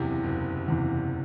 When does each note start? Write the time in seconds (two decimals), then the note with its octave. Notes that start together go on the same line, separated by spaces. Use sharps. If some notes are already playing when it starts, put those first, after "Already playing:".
Already playing: F#1 E2 C3 E3
0.24 F#1
0.68 E2 C3 E3